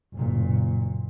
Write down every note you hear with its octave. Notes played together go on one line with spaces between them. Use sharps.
F#1 A#2